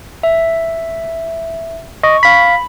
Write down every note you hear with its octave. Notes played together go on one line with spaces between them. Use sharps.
E5
D#5 C#6
F5 B5 B6